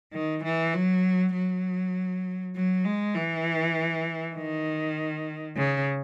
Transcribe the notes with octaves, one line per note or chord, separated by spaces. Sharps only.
D#3
E3
F#3
F#3
F#3
G#3
E3
D#3
C#3